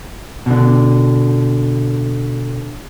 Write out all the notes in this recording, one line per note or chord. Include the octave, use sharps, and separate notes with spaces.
B2 D3